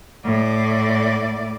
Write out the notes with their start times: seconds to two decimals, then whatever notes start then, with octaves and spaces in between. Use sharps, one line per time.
0.25 A2 D5